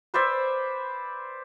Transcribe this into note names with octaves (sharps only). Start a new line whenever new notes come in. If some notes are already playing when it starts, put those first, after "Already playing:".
B4 C5 D5 E5